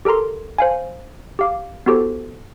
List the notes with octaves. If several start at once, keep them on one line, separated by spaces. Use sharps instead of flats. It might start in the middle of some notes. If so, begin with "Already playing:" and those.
G4 A4 A#4 A#5 C6
C5 F5 G#5
G4 F5 D6
B3 E4 F#4 G4 A4 C5